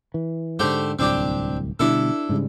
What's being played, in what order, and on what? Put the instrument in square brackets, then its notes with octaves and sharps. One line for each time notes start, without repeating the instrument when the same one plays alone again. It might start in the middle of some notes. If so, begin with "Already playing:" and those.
[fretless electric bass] E3
[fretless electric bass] G#2 D3 [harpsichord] A3 G4 C5
[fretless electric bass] D1 C2 [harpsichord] C4 D4 G4
[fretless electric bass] B2 D3 G3 [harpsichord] D4 E4 A4
[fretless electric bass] G#2 C#3 G3